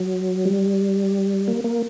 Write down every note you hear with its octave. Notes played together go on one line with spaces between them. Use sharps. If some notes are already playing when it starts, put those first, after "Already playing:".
Already playing: F#3
G3
A#3
A#3